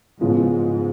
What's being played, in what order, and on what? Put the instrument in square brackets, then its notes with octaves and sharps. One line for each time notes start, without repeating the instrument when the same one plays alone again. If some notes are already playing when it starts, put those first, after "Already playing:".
[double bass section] G#2 [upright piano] C#3 F3 G#3 B3 F4